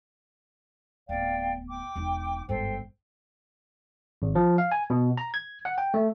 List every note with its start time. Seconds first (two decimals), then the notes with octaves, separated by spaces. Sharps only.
1.09 D1 B3 D5 F5 G5
1.68 G5 D6
1.96 E1 D#4
2.49 G1 G#2 A4 C5 G5
4.22 G#1
4.35 F3
4.58 F5
4.72 G#5
4.90 B2
5.17 A#5
5.34 G#6
5.65 F#5
5.78 G5
5.94 A3